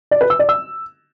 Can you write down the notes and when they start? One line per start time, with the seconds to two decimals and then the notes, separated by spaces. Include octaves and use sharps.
0.11 D5
0.21 B4
0.30 E6
0.39 D5
0.49 E6